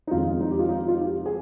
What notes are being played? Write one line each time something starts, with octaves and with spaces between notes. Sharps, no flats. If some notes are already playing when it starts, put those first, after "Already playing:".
D#4
F2 D#3 G#3 F4
D#4
G4
F4
D#4
F4
G4
G#4